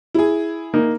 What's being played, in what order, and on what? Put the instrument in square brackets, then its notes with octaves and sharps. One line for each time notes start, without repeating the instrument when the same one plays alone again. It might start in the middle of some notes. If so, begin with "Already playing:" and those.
[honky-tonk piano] E4 G#4
[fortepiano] A#3 D#4